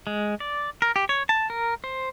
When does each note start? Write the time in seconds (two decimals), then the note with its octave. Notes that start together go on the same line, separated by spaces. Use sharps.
0.07 G#3
0.40 D5
0.82 A#4
0.96 G4
1.09 C#5
1.29 A5
1.50 A#4
1.84 C5